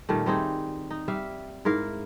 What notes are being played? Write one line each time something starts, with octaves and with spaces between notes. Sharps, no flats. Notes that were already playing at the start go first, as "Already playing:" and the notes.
A#2 D#3 G3 A3
G3 C4 D#4 G#4
D#4
G3 E5 F5
G#2 E4 A#4 F5